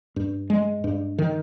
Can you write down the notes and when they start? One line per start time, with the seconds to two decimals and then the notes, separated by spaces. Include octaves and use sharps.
0.16 G2
0.50 G#3
0.84 G2
1.18 D#3